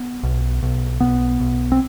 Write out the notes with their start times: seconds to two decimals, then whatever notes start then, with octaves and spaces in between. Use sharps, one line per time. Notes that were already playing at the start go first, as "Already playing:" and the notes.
Already playing: B3
0.23 B1
0.63 B1
1.00 B1 B3
1.40 B1
1.72 C4